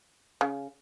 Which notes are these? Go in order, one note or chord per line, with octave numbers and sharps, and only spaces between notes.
C#3